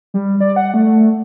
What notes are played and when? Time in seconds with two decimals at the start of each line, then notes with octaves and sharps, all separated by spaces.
0.14 G3
0.41 D5
0.56 F#5
0.74 A3